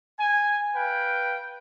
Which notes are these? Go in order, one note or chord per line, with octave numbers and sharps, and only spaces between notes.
G#5
B4 F5 G5